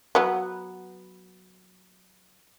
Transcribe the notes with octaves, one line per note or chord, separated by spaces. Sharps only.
F#3 B3